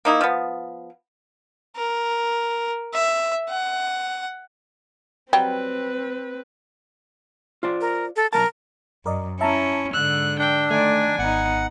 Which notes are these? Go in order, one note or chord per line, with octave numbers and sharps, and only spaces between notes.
A#3 D#4 E4
F3 B3
A#4
E5
F#5
F#3 G3 C4 B4 G5
F4 C5 D5
A#4
A4
B1 F#3 A#4 A5
F#2 A#4 D5 D#5
C#4 E4 E5 A5 A#5
G#2 D3 E6 F#6
D4 G5
D#3 A3 D5 G#5
G#1 B3 D#4 F#5